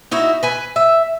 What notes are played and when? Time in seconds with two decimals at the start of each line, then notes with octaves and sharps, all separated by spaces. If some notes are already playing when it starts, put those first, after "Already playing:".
0.11 D#4 E4 F#4
0.43 B4 G#5
0.76 E5